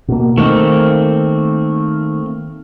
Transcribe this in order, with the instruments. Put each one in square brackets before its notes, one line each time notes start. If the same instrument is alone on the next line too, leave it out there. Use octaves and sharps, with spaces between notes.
[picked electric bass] B2 A#3
[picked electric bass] D#3 [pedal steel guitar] A3 A#3 C4